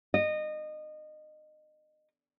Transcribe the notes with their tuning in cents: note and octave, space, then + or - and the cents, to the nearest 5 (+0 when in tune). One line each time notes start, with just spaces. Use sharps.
D#5 -25